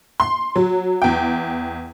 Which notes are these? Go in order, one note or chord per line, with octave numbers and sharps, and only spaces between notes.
C6
F#3
E2 G5